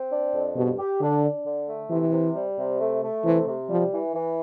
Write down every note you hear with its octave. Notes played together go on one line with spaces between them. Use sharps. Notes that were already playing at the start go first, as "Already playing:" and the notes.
Already playing: C4
D4
F2
G2 B2
G4
D3 D4
D4
D3
A3
C3 E3
C3
G3
C3
A3
A3
C3 E3
C3
F3 G3
E3
E3